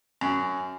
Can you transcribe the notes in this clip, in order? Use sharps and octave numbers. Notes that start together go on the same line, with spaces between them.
F#2